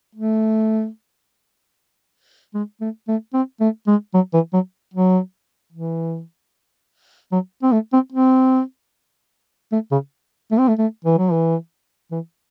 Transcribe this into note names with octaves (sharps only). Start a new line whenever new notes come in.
A3
G#3
A3
A3
C4
A3
G#3
F#3
E3
F#3
F#3
E3
F#3
C4
A3
C4
C4
A3
C#3
A3
C4
A3
A3
E3
F#3
E3
E3